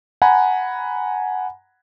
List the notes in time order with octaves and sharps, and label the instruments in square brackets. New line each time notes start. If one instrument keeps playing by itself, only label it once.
[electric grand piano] F#5 G#5 A#5 B5